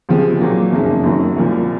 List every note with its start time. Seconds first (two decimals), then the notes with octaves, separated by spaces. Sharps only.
0.09 C#2 C3 F3 G#3
0.41 A#2 F#3 A#3
0.72 F#1 F2 C#3 G#3 D#4
1.04 F#2 D#3 F#3
1.36 C2 A#2 F3